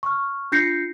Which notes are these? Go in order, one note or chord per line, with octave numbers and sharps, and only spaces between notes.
C#6 F6
D4 F4 G6 A#6 C7 C#7